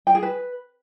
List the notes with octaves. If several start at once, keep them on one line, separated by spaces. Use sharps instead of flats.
G5
G#4
B4